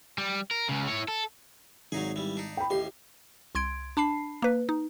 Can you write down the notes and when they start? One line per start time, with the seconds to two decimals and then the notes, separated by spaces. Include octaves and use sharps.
0.18 G3
0.51 A#4
0.69 C#2 C#3
0.88 E4 C#5
1.08 A4
1.92 G#1 F#3 D#4 G#4
2.16 E3 G3
2.37 D4 D#4
2.57 G5 B5
2.70 A1 D#2 G4 C6
3.55 C2 C6 G#6 D7
3.97 D4 A5 B5 C7
4.42 A#3 B4
4.69 D#4